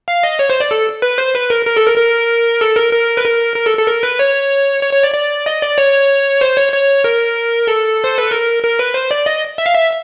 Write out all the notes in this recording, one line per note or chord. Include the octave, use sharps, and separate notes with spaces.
F5
D#5
C#5
C5
D5
A4
B4
C5
B4
A#4
A#4
A4
A#4
A#4
A4
A#4
A#4
B4
A#4
A#4
A4
A4
A#4
B4
C#5
C#5
C#5
D5
D5
D#5
D5
C#5
C5
C#5
C#5
A#4
A4
C5
B4
A#4
A#4
B4
C5
D5
D#5
E5
F5
E5